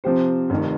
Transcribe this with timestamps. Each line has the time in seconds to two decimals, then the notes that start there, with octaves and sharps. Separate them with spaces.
0.04 C3 F3 C4 G4 C5
0.50 F1 F2 D#3